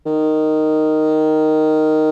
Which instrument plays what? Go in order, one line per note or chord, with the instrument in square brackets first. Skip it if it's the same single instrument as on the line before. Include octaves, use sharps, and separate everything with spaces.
[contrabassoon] D#3